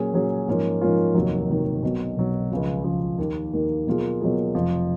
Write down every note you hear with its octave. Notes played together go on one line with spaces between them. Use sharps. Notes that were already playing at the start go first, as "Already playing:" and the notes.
Already playing: A#2 F#3 C#4 G#4
A#2 F#3 C#4 G#4
G#2 F3 A#3 C#4 F4
G#2 F3 A#3 C#4 F4
F1 D#2 D#3 F#3
F1 D#2 D#3 F#3
B1 B2 F#3
B1 B2 F#3
C#2 C#3 F3
C#2 C#3 F3
D#2 D#3 A#3
D#2 D#3 A#3
B2 F#3 A#3 F4 G#4
B2 F#3 A#3 F4 G#4
F1 F2 F3